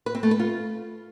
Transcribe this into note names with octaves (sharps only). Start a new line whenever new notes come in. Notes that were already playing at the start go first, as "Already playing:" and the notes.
B4
C4
A3
B4
F4